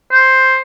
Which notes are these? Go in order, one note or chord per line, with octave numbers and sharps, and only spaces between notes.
C5